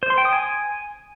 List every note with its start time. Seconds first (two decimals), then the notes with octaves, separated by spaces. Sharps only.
0.03 C5
0.10 C6
0.18 G5
0.25 D#6
0.33 G#5